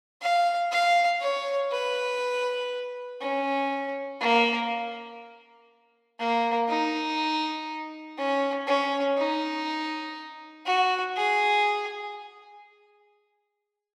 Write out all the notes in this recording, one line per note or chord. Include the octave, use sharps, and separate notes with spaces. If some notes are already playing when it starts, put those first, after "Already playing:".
F5
F5
C#5
B4
C#4
A#3
A#3
D#4
C#4
C#4
D#4
F#4
G#4